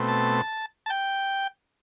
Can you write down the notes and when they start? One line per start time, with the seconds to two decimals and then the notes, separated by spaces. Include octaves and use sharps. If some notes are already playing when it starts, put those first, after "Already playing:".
Already playing: B2 A3 C4
0.08 A5
0.86 A5
0.90 G5